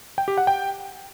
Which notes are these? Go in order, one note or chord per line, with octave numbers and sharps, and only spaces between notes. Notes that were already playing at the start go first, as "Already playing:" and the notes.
G5
G4
F#5
G5